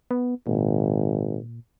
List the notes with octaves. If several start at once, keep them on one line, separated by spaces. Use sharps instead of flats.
B3
G#1 A#2